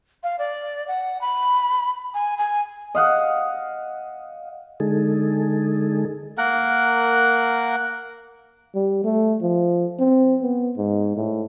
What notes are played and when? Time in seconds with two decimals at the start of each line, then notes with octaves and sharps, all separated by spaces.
0.23 F5
0.39 D5
0.88 F#5
1.21 B5
2.14 G#5
2.38 G#5
2.95 D#5 F5 F#5
4.80 D3 G#3 D#4 G#4 A4
6.38 A#3 A#4 F#5
8.75 G3
9.04 A3
9.42 F3
9.99 C4
10.42 B3
10.77 G#2
11.17 A2